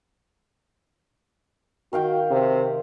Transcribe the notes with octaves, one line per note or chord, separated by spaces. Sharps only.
D#3 F#4 F5 G5
C3